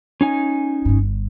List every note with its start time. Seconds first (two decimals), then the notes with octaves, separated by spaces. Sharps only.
0.21 C#4 D#4 G#5
0.85 G1 G2